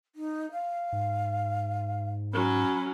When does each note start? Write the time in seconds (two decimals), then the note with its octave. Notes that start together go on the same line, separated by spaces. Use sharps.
0.16 D#4
0.51 F5
0.92 G#2
2.33 F#3 C#4 B5